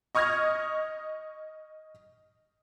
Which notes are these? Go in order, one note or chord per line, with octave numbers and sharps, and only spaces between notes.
D#5 C#6 D#6 F6 G#6 A#6